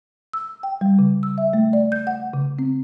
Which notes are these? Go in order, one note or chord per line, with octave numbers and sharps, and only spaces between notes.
E6
G5
G3
C#3
E6
E5
A3
D5
G6
F#5
C#3
C4